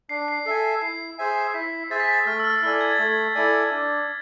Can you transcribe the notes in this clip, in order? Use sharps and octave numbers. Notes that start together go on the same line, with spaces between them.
D4 C7
C7
A4 E5 G#5 C7
C7
E4 C7
G#4 C5 E5 G#5
E4 B6
G#4 C5 E5 G#5 A6
B6
A6
A3 F6
E6
F6
E6
E4 A4 D5 G#5 F6
G#6
A6
A3 G#6
E4 A4 D5 G#5
D4